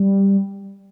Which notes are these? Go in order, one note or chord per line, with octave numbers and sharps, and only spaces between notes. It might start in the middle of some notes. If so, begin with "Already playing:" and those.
Already playing: G3